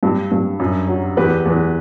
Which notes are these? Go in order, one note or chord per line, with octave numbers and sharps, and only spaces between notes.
G2
G2
F#2
F#3
E2 G4 B4
E2